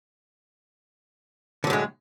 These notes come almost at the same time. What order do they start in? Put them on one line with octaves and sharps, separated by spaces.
D3 F#3 A2 G#3